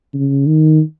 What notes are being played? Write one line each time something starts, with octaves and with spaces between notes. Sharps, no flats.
C#3
D#3